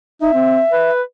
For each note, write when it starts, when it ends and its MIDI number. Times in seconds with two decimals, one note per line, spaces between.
0.22 0.30 63
0.22 0.91 76
0.33 0.61 60
0.72 1.02 71